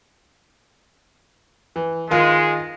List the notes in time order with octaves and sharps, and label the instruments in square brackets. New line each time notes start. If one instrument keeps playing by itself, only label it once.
[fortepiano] E3
[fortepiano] D#3 F4 [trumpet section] G#3